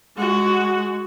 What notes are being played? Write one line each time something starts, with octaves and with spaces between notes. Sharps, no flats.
G#3 F#4